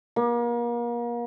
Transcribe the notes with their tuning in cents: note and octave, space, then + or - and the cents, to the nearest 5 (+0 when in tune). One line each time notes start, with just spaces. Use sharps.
A#3 +35